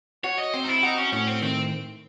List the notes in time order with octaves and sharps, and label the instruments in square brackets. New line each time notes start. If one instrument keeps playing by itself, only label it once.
[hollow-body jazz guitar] F#4 [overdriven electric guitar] C#5
[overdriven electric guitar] D#5
[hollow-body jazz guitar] C4 [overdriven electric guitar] C5
[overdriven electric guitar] D#4
E4
[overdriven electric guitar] D#4 [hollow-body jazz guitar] F#4
[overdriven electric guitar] C#4
[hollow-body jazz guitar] A2 [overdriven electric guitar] C#4
[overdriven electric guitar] C4
[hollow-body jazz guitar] D#3 [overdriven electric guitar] C4